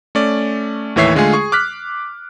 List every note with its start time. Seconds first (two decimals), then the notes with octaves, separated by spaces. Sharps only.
0.15 A3 C#4 D5
0.96 D#2 A2 E3 C#5 E5 C7
1.15 D3 G#3 A3 F4 G#4
1.33 G#4 C#6
1.52 D6 F6 F#6 B6